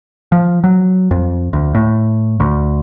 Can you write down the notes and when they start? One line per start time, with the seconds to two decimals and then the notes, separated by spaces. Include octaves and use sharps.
0.32 F3
0.64 F#3
1.11 F2
1.53 D2
1.75 A2
2.40 D2